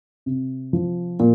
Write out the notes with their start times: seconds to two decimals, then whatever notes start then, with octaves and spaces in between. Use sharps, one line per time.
0.26 C3
0.73 F3
1.20 A#2